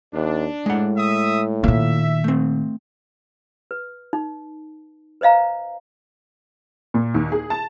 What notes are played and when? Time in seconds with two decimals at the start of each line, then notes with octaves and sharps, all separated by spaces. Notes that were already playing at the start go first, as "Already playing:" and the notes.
0.13 D#2 D4
0.66 A2 G#3 F#5
0.97 E5 D#6
1.64 A#2 D#3 A#3 E5
2.24 A3 C4
3.71 B4
4.13 D#4
5.21 B4 C5 D#5 F5 A#5
6.94 A#2
7.14 D#2
7.32 G#4
7.50 A5